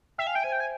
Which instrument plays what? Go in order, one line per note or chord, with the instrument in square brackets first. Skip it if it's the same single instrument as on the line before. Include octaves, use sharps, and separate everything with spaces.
[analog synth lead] E5 [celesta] G5
[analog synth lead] F5 [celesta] G#5
[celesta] E5 [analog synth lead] G5
[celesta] C5 [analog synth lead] G#5
[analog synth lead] G5
G#5